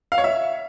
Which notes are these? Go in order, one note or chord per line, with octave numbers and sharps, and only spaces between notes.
F5
C#5
E5